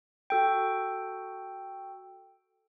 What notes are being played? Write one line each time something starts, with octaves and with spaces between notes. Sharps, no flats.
F#4 A4 G5